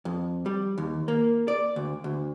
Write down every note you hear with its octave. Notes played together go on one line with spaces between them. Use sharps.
F2
G3
D#2
A#3
D5
D2
D2